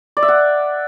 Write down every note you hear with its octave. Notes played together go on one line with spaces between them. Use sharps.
D5
E5
F#5